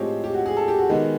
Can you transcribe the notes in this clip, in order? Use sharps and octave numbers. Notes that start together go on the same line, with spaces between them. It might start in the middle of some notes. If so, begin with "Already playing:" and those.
Already playing: A2 F3 G#3 C4 G4 C#5 D#5
G4
F#4
G#4
A4
G4
F#4
D#3 G#3 B3